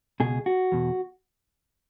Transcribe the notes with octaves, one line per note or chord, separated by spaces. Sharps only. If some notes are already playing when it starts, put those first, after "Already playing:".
C#2 B2 G#4
F#4
E2 B2